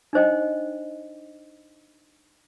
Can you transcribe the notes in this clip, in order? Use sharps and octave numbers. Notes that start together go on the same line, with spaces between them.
D4 D#4 C5 D#5 G5